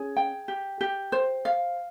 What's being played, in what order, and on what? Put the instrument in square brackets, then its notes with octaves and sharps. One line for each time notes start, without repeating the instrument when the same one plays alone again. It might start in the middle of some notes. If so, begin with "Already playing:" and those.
Already playing: [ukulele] C#4 G#4
G5
G4
G4
C5
F5